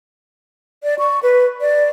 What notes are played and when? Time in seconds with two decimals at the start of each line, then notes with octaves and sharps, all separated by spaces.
0.83 D5
0.99 C#6
1.23 B4
1.61 D5